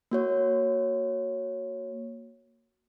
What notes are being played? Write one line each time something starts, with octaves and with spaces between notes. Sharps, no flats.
A#3 F#4 C#5